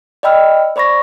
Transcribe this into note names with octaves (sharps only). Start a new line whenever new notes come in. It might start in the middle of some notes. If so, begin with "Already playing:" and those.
D5 D#5 G5 B5 E6 F6
C5 D5 B5 C#6 A#6